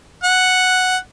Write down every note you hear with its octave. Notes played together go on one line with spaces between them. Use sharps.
F#5